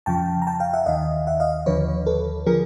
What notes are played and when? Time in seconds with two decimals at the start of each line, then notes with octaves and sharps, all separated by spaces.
0.06 F2 C#3 F3 G5 A5
0.42 A#5
0.47 G5 A5
0.60 F5 G5
0.73 E5 F#5
0.86 D#2 D#3 D#5 F5
1.27 E5 F#5
1.40 D#5 F5
1.66 D#2 D3 F3 B4 C#5
2.06 A4 B4
2.46 D3 F3 G#4 A#4